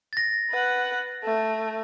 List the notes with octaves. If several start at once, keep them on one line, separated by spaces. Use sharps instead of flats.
A6 A#6
B4 F#5
A3